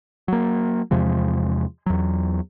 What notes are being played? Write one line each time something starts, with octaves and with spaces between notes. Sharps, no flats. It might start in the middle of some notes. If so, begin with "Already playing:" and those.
F#3 A#3
E2 C3 F3 G#3
E2 F#3